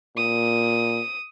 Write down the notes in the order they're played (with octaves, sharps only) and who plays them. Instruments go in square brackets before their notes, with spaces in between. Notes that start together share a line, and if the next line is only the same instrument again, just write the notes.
[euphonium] A#2 [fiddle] D#6